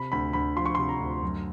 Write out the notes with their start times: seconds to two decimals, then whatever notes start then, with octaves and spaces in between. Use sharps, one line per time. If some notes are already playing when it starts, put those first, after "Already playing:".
Already playing: C3 B5
0.12 D2 B5
0.33 D2 B5
0.56 F3 C6
0.66 C#6
0.75 C3 C6
0.89 A#5
1.00 D2
1.22 F#2